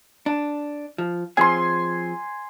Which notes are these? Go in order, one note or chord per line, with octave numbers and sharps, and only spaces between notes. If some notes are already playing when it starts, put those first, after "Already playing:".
D4
F3
F3 C4 G#4 G#5 C6